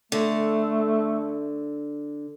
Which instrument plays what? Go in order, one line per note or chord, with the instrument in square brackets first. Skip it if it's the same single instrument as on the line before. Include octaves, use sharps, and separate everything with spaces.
[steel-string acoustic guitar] D3 [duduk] A3